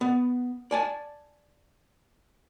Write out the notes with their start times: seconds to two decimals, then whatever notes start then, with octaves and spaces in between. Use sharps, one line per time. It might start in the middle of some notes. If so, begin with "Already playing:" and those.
0.01 B3
0.71 D5 G#5 A5